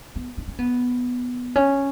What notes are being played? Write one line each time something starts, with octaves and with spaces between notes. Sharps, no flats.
B3
D4
C#4
B3
C#4